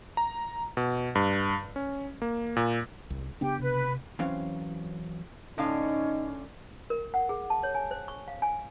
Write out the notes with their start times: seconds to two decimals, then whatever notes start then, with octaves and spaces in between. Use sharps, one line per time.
0.17 A#5
0.77 B2
1.15 G2
1.76 C#4
2.22 A#3
2.56 A#2
3.10 C2
3.41 C#3 B3 D4 G4 G5
3.59 C3 B4
4.19 E3 F#3 C4 C#4 F5
5.58 A2 D3 C#4 D#4 F5
6.90 A#4
7.14 F#5
7.29 G#4
7.50 A5
7.63 C#5
7.75 G#5
7.91 C5
8.08 C#6
8.28 F5
8.42 G#5